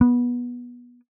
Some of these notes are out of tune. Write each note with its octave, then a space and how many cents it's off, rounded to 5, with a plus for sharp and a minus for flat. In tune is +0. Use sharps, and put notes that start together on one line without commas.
B3 -20